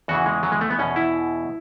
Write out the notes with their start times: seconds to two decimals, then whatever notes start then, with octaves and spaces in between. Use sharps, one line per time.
0.08 E2 C#3 E3 F#4
0.26 G#3
0.43 F#3
0.52 G#3
0.61 A3
0.70 B3
0.79 E2 B2 C#4
0.96 E4